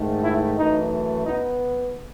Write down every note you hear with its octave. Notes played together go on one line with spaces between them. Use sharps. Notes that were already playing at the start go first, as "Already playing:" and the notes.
Already playing: G#2 D#3 A3
E4
F#2 E3 A3 D#4
B3 D#4